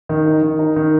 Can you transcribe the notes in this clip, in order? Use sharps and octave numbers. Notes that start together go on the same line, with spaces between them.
D#3
D#4
D#3
D#4
D#3